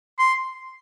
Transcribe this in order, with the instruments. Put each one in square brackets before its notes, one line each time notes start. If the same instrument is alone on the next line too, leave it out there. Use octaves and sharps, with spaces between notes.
[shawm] C6